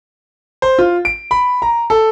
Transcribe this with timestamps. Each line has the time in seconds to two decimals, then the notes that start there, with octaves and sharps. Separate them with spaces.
0.62 C5
0.79 F4
1.05 D7
1.31 B5
1.62 A#5
1.90 A4